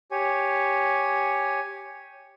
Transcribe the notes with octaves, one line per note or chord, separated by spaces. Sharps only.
G4 C#5 G#5